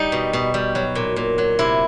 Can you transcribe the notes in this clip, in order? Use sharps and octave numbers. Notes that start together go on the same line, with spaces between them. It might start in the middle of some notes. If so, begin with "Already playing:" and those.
Already playing: G3 D#4
B2
B2
G3
F#3
A#2
A#2
F#3
C3 E4